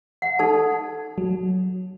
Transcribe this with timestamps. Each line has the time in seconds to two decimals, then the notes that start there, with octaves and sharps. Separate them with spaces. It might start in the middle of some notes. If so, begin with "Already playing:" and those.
0.22 F#5
0.39 D#4 A4 A5
1.18 F#3